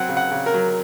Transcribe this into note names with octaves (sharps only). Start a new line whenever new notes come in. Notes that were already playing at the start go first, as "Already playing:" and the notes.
Already playing: F#3 C4 F#5
C#3
F#5
C#3
A#4
F#3